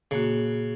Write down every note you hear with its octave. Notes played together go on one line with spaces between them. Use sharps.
A#2 C#3 A#3 F#4